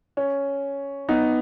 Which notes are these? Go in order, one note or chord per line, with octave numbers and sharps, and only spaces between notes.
C#4
B3 D#4